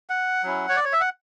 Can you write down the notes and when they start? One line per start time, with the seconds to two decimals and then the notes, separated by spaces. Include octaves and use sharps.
0.10 F#5
0.43 F#3 C#4 E4
0.69 C#5
0.76 D5
0.84 C#5
0.93 E5
1.01 F#5